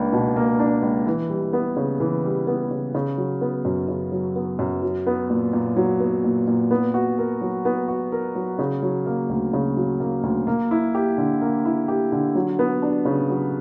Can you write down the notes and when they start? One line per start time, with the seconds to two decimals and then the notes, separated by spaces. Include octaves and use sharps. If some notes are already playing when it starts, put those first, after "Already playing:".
Already playing: C#2 A#3 D4
0.12 B2
0.36 A#3
0.59 D4
0.82 C#2
1.07 E3
1.30 G3
1.53 B3
1.77 C#3
2.00 E3
2.24 G3
2.47 B3
2.71 C#3
2.95 C#3
3.17 F#3
3.41 B3
3.65 F#2
3.88 C#3
4.12 F#3
4.36 B3
4.59 F#2
4.82 F#3
5.07 B3
5.30 A#2
5.53 A#2
5.76 F#3
6.00 B3
6.24 A#2
6.47 A#2
6.71 B3
6.94 F#4
7.18 A#4
7.41 F#3
7.65 B3
7.88 F#4
8.12 A#4
8.35 F#3
8.59 C#3
8.83 F#3
9.06 A#3
9.29 D2
9.53 C#3
9.77 F#3
10.00 A#3
10.23 D2
10.47 A#3
10.71 E4
10.95 G4
11.18 D3
11.42 A#3
11.65 E4
11.88 G4
12.12 D3
12.35 F#3
12.59 B3
12.82 D4
13.05 C#3
13.30 F#3